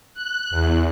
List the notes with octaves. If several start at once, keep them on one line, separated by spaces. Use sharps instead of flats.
F#6
E2